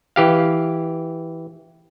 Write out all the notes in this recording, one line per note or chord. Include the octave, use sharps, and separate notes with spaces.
E3 G4 F5